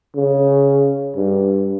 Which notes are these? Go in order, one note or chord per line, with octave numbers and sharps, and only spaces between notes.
C#3
G2